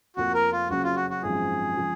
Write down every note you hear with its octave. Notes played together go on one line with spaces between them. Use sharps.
F1 F2 F3 A#3 F#4
A#4
F4
F#1 F#2 C#3 F#3 F#4
F4
F#4
F#4
G#1 F#2 F3 G#3 G#4
C#3 F3 G#3